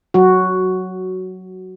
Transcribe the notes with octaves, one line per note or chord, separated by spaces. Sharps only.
F#3 F#4